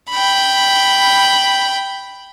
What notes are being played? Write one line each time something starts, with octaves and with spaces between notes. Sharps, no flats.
G5 B5